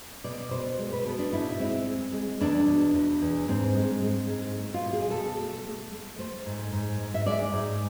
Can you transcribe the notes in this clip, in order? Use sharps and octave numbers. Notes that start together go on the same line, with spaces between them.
B2 D5
B2 C5
G#3
B4
B2 A4
D4
G#2 E4
G#3 C4
G#3
G#3
E2 D4
B2
E2
E2
G#2 C4
G#3
G#3
G#2
A3
F4
B2
G#4
B2 A4
A3
A3
A3
A3 C5
G#2
G#2
G#2
E5
G#3 D5
G#2